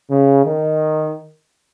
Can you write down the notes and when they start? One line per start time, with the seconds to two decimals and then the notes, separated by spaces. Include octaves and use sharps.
0.11 C#3
0.44 D#3